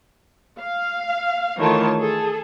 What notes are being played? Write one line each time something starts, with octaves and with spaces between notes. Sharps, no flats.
F5
D#3 E3 A3 F4 C#5 A5
G#4 A4